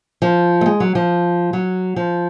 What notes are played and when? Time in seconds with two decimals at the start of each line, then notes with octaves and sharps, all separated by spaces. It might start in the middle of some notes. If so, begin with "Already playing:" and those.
0.22 F3
0.61 A3
0.66 G#3
0.80 F#3
0.95 F3
1.53 F#3
1.96 F3